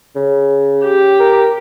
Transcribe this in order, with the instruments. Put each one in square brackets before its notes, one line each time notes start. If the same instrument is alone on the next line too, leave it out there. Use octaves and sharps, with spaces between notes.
[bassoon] C#3
[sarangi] G4
[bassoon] A#4